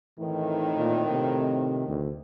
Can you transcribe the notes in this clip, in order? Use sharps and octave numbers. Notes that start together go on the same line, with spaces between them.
F2 A2 D#3 E3
A#2
C3
D2